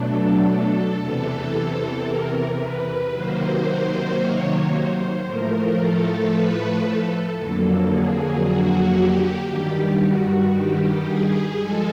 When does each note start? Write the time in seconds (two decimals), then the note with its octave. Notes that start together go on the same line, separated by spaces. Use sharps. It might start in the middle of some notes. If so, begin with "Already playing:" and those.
Already playing: B2 F#3 A3 D4 A4
0.47 A4
0.99 E2 C3 E3 A4
1.53 A4
2.06 A#4
2.58 B4
3.11 C3 D#3 F#3 A#3 C5
3.64 C5
4.18 C#5
4.71 C5
5.23 A2 F3 A3 A#4
5.77 A4
6.29 B4
6.82 A4
7.35 F2 D3 F#3 A#3 A4
7.88 G#4
8.41 F#4
8.95 G4
9.47 G2 D#3 G3 G4
10.00 F#4
10.53 G4
11.07 G#4
11.60 F3 G#3 A4